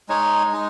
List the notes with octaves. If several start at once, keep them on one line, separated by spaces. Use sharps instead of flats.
G#3 D#4 C#5
G#3 D#4